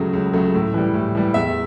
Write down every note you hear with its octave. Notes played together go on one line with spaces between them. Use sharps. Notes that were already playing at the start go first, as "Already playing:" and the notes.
Already playing: C#2 C#3 F#3 A3
C#2
C#3 F#3 A3
A2
E3 G3
A2
E3 G3
E2 E5